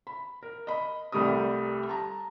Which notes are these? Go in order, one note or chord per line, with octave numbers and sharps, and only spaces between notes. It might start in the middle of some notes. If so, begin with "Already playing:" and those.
B5
A#4
D#5 B5
C2 G3 A3 G4 A#4 D#6
A5 A#5